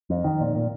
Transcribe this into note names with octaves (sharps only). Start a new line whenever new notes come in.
F2
D#3
A#2
A#2